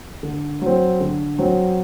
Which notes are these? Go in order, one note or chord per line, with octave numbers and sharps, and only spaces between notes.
D3
F#3 C4
D3
F#3 C4